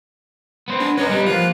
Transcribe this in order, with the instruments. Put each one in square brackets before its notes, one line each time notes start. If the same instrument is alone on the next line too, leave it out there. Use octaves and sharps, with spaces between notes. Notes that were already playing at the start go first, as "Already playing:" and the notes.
[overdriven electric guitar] B3 C5
[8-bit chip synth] D4
[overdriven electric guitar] C#4 A#4 [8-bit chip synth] B4 D#5
[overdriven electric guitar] G3 B3
[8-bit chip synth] F3 A#3 F#6 [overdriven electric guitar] F4